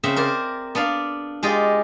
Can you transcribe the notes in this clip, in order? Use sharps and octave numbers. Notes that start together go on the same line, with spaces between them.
C#3 C4 E5
A#4 C5 D5
B3 D4 D5 F5
G#3 F4 G4 D5 D#5